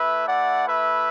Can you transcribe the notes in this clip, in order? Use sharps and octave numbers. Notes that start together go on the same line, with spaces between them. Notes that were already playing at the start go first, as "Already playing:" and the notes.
Already playing: A3 E4 B4 E5
D5 F#5
B4 E5